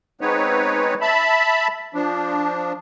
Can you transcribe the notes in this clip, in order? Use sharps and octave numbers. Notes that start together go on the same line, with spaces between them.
G#3 B3 C4 D#4 B4 C#5
E5 A5 B5
F3 D4